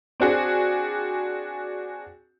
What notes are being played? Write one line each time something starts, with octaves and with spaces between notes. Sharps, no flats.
C4 D4 F#4 G#4